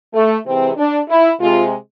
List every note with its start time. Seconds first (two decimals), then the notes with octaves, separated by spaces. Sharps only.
0.13 A3
0.45 C3 E3 G#3 C4
0.77 D4
1.08 E4
1.39 C3 G#3 F4